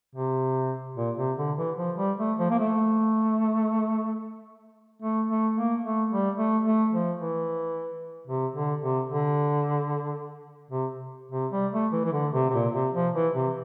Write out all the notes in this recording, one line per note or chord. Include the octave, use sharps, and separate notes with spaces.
C3
A#2
C3
D3
E3
F3
G3
A3
F3
A#3
A3
A3
A3
A#3
A3
G3
A3
A3
F3
E3
C3
D3
C3
D3
C3
C3
G3
A3
E3
E3
D3
C3
C3
A#2
C3
F3
E3
C3